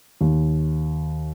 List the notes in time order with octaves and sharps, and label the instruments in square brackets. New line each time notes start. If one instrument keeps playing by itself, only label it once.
[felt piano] D#2